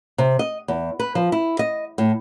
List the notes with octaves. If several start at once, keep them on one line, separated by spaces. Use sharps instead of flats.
C3
D#5
E2
B4
F3
E4
D#5
A2